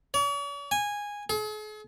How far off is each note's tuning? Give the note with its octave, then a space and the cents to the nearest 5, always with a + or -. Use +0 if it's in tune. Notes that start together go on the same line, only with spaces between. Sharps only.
C#5 +45
G#5 -10
G#4 +45